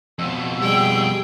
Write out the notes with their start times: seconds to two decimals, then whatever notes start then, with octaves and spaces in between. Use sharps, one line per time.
0.19 F2 B2 E6
0.61 G3 G#4 G5